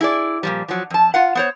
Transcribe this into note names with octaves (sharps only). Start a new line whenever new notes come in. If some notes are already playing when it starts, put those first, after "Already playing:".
E4 G#4 D5
A#2 F3 G3
F3 F#3
F2 A5
F4 F5 F#5
B3 C5 C#5